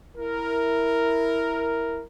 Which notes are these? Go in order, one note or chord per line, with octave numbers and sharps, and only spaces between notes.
E4 A#4